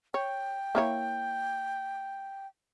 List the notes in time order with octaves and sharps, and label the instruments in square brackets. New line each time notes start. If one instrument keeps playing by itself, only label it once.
[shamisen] C#5 [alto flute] G5
[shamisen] A#3 E4 C#5